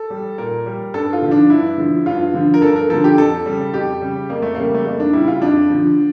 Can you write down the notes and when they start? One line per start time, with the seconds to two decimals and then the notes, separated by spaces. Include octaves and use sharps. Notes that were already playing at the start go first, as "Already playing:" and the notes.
Already playing: A4
0.10 G3
0.38 A#2 A#4
0.66 G3
0.94 G2 A4
1.13 F4
1.22 D3 F3
1.31 D4
1.50 G2 E4
1.78 D3 F3
2.06 G2 F4
2.34 D3 F3
2.54 A#4
2.62 G2 A4
2.76 A#4
2.89 D3 F3 A4
3.04 G4
3.18 F2 A4
3.46 C#3 G3
3.74 F2 G4
4.02 C#3 G3
4.29 F2 A#3
4.42 A3
4.55 C#3 G3 A#3
4.74 A3
4.85 F2 A#3
5.00 D4
5.13 C#3 G3 E4
5.27 F4
5.41 F2 D4
5.69 D3 F3